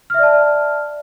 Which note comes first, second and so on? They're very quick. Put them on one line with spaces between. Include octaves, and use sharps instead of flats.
F6 E5 D5 A5